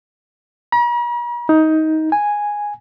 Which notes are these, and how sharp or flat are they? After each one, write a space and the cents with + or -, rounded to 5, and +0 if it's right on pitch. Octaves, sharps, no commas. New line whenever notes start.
A#5 +45
D#4 +15
G#5 -5